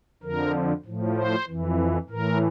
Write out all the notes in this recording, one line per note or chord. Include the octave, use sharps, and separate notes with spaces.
F2 D3 F3 A#4
A2 F3
C5
F2 E3
A2 E3 A#4